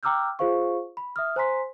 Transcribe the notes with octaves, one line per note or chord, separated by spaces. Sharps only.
G5 A#5 D6 E6 F6 G6
F4 G#4 C5 F5 C#6
B5
E5 D#6 F6
C5 G#5 A#5 C6 B6